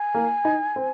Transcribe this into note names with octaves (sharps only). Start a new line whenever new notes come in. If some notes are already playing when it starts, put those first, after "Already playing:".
Already playing: G#5
A#3
D#4
C4